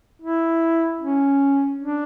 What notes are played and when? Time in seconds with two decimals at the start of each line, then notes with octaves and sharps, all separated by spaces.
0.22 E4
1.00 C#4
1.79 D4